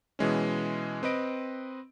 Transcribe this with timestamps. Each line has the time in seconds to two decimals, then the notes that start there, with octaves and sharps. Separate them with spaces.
0.19 B2 E3 G#3 C#4
1.03 C4 B4 D#5 D7